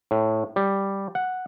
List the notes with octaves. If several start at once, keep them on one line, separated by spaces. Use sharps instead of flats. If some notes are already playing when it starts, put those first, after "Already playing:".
A2
G3
F#5